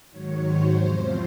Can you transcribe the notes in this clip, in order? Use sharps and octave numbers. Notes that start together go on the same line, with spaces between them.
G#2 D#3 F#3 C#5
C5
E2 C3 F3 C5